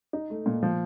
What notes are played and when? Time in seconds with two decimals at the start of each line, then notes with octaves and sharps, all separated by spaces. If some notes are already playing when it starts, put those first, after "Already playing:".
0.13 D#4
0.30 A3
0.46 A#2
0.63 F3